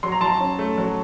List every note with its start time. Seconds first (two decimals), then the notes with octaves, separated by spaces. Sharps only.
0.03 F#3 C6
0.12 A#5
0.21 F#3 A5 C6
0.40 C#4
0.59 A3
0.78 F#3